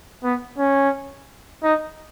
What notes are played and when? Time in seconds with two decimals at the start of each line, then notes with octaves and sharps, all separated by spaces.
0.24 B3
0.58 C#4
1.64 D#4